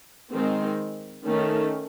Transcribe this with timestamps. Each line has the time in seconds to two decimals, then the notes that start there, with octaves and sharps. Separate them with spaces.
0.33 D#3 G#3 C4
1.26 D#3 A3 C#4